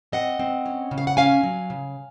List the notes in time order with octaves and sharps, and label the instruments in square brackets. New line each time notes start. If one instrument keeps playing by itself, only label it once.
[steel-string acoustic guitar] C4 D#5 F#5
C4
C#4
C#3
F5
F#5
C#4 F5 G#5
F#3
C#3